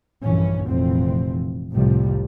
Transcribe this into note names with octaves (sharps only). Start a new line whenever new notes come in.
A#1 G2 A#2 E3 C#4
F1 F2 A#2 E3 C4
C2 F2 A2 C3 F3 G3